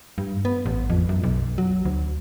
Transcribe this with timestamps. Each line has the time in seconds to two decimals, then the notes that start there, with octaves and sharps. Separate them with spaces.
0.18 G2
0.45 B3
0.66 A1
0.90 F2
1.09 F#2
1.24 B1
1.58 F#3
1.85 D2